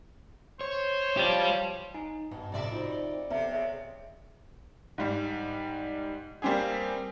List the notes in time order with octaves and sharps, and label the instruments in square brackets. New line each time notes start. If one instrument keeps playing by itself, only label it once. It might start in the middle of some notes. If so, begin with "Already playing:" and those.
[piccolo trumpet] C5 [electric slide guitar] C#5
[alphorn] F3 [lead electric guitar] G4 D5
[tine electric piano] D#4 [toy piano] G#5
[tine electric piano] G2 [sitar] B2
[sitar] F2 D5 E5 [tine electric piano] A2 C3
[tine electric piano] D#4 C5 [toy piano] F4 F#4
[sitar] C3 [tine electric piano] B3 A4 [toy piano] B4 E5 A5
[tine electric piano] G#4 C#5 [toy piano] C5 D#5 E5
[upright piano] G#2 G3
G3 A#3 C4 G4 G#4